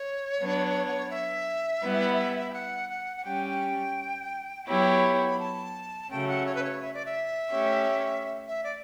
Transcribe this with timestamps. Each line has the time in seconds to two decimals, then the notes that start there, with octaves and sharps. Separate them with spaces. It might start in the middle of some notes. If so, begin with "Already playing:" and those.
Already playing: C#5
0.39 F#3 B3 D4
1.11 E5
1.83 G3 B3 E4
2.50 G5
2.54 F#5
2.90 F#5
3.17 F#5
3.25 G3 C#4 G4 G5
4.68 F#3 B3 E4 G4 C#5
5.29 B5
5.40 A5
6.10 C#3 F#3 A3 C#4 G5
6.28 F#5
6.46 C#5
6.55 B4
6.64 C#5
6.82 E5
6.94 D5
7.05 E5
7.53 A3 C#4 G4 C#5
8.48 E5
8.64 D5